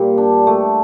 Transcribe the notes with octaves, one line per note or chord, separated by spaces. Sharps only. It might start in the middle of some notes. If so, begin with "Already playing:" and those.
Already playing: A#2 G3 G4 A#4
D4
A3